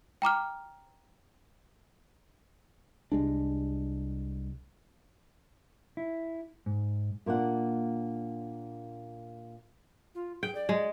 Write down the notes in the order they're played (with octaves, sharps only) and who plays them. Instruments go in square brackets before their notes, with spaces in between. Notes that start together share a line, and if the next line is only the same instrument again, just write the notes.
[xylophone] G5 A#5 D6 F6
[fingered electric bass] C2 G#3 D4
[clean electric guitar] E4
G#2
[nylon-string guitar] A#2 A#3 D4 F#5
[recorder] F4
[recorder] G#4 [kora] G5
[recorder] D5
[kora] G#3